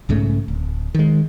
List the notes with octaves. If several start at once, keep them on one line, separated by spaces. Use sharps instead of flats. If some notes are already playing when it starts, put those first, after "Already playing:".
B1 G#2 C#3 A3
D1
D#3 G#3